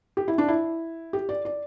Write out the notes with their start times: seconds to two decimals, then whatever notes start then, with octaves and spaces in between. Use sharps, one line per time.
0.17 G4
0.28 E4
0.38 D4
0.48 E4
1.13 G4
1.29 D5
1.45 D5